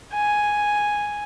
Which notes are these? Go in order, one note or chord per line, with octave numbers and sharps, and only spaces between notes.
G#5